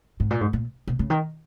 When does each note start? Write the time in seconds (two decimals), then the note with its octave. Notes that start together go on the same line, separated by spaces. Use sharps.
0.20 G#2
0.31 A#2
0.41 G#2
0.53 A#2
0.88 B2
0.99 C#3
1.10 D#3